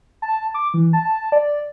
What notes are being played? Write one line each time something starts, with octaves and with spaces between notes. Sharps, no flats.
A5
D6
E3
A5
D5